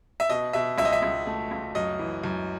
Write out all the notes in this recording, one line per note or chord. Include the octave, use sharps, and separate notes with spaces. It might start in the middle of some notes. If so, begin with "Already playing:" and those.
E5
B2 D#5
B2 E5
C#2 E5
D#5
E5
C#2
A3
C#2
F#2 D#5
E3
F#2